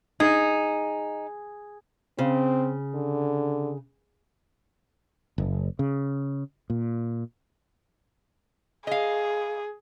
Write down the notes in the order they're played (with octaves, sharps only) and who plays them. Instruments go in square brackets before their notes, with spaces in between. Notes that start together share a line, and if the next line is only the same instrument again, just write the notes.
[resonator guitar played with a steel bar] D#4 [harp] G#4
[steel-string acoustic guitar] C#3 [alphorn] C4
[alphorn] D3
[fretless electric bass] F#1
C#3
A#2
[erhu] G#4 [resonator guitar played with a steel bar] D#5 F5